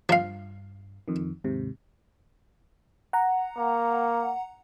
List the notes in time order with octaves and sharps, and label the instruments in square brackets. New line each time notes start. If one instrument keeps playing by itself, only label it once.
[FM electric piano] G2 [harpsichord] F3 F5
[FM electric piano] F2 D#3
D#2 G#2 C3
F#5 A#5
[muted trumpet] A#3